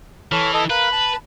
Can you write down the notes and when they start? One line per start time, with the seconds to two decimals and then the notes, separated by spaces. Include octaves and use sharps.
0.32 E3 A4 C#5 F6
0.54 A4 D#5
0.70 A#4 B4 F5 F#6
0.92 A5 B5